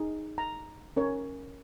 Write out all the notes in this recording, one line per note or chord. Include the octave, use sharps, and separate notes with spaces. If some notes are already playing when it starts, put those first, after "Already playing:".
Already playing: D#4 G#4
A#5
C#4 A#4 C#5